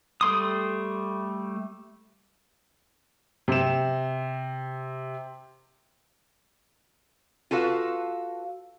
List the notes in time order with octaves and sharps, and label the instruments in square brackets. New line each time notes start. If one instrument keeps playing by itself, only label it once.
[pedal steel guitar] G3 A3 C6 D#6
[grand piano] C3 E7
[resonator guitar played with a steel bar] F4 F#4 A4 B4 F5